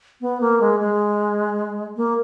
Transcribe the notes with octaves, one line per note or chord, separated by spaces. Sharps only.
B3
A#3
G#3
G#3
A#3